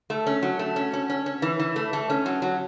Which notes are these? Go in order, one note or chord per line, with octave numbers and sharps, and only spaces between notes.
A3
C#4
F#3
A3
C#4
C#4
C#4
C#4
E3
E3
A3
A3
C#4
F#3
F#3